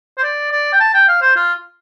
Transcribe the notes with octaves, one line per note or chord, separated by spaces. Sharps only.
C5
D5
D5
G5
A5
G5
F5
C5
F4